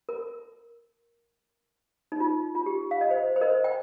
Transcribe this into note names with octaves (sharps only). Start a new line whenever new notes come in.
A#4
D#4
F4
F4
G4
F5
D#5
C5
C5
A#4 D#5
G5